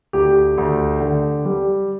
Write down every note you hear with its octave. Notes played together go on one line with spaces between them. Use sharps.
D2 G4
D2
D3
G3